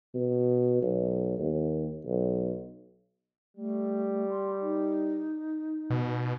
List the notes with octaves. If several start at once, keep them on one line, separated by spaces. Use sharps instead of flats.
B2
B1
D#2
B1
G3 A3
C6
D#4
B2